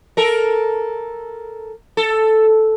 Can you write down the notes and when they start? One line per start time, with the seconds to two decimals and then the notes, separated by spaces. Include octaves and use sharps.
0.17 A4 A#4
1.97 A4